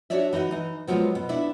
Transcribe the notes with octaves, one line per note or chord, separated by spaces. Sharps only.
D4 F#4 C#5 D5 E5
E3 D#4 F#4 D#5
E3 D#4
F3 F#3 G#3 B3 F4
B2
B3 D4 E4 E5